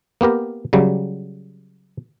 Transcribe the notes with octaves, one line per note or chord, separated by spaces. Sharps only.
A#3 B3 G4 A#4
C#3 F#3 G3